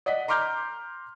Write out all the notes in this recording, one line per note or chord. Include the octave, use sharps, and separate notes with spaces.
D5 D#5 F#5 B6
A#5 C6 D6 F6 G6